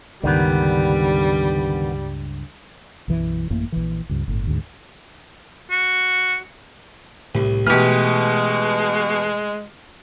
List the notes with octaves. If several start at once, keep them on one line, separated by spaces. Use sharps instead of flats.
C#2 G2 D3 D#3 G3 B3
B1 F#2 E3
A1 F#2 A2 A#3
A#1 E3
C#2 G2
G1 A2
D2 G#2
F#4
C2 A2
B2 E3 G#3 A3 G4 F6